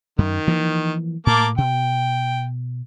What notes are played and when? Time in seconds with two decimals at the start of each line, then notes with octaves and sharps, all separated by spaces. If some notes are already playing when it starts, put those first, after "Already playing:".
0.18 F#2 D#3
0.47 E3 F3 A#3
1.27 A2 A#3 A5 D6
1.58 B2 G5